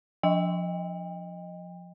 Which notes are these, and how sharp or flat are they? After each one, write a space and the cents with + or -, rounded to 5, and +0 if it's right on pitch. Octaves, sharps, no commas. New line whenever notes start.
F3 +10 D#5 +0 G5 +30